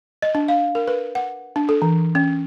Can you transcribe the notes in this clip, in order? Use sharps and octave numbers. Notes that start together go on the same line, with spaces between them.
D#5
D4
F5
A#4
B4
F#5
D4
A4
E3
C#4